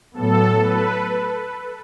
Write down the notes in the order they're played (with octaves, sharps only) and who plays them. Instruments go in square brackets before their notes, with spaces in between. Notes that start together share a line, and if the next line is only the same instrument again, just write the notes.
[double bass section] A2 F#3 B3 [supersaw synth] A4
[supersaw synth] B4